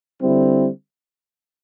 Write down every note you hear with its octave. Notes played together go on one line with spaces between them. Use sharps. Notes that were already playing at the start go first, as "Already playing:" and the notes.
D3 G3 C4 E4